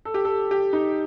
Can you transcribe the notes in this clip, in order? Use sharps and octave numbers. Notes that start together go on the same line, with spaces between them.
A4
G4
A4
G4
D#4